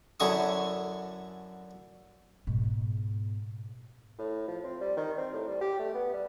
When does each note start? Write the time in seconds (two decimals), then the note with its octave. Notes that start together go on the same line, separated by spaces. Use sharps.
0.20 F#2 D3 E4 G#5 C#6 D#6
2.47 G#2 B2
4.19 A2
4.48 F3
4.64 C4
4.81 G3
4.97 D#3
5.18 C4
5.34 A2
5.48 G3
5.61 G4
5.79 A3
5.94 B3
6.14 G3